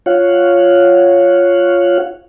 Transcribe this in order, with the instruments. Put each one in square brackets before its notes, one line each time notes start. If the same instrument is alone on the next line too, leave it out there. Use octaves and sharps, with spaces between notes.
[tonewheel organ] F4 C#5 F5 F#5